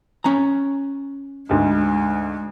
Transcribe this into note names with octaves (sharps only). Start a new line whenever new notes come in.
C#4 A#5
D2 G#2 G#3